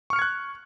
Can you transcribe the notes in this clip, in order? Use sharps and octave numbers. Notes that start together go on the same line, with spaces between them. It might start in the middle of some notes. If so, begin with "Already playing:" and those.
C#6 F6 F#6 G#6 C#7